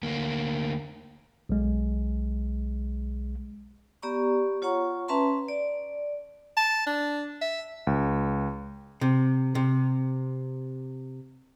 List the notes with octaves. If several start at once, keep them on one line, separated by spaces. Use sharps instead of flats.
D2 A#3
B1 G#3
B3 G4 D5 A#5 C#6
F4 C#5 F#5 A#5 C#6
C#4 B4 E5 A5 A#5 C6
D5
A5
D4
E5
C#2
C3
C3